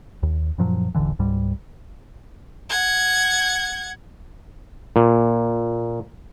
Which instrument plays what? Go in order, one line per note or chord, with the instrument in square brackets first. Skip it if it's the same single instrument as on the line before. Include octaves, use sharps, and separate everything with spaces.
[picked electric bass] D#2
F#2 A#2 F3 F#3
D#1 A1 D3 E3
C#2 G#2 G3
[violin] F#5 G#6
[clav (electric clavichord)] A#2